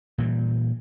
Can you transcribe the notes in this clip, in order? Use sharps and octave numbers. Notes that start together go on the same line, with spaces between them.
A#2 E3 F#3 G3